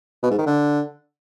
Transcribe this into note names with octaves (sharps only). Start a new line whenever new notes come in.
B2
G#2
D#3
D3